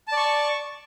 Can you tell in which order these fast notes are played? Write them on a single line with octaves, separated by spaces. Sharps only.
A5 D5 C#6